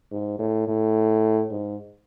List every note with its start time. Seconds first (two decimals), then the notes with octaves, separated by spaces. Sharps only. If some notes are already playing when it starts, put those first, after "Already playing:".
0.12 G#2
0.39 A2
0.68 A2
1.51 G#2